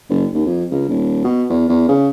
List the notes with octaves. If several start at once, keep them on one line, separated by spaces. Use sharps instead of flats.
F#1
D#2
F2
C#2
D#1
B2
E2
E2
C#3